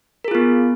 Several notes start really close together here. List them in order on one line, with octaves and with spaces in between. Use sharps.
A#4 G#4 F4 B3